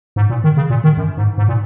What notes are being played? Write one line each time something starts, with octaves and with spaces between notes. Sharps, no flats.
G#2
A#2
D#3
C#3
A#2
D#3
F#2
G#2
G#2
A#2